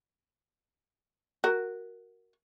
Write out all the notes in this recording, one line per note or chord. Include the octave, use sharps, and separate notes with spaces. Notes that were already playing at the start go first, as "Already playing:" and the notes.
F#4 A#4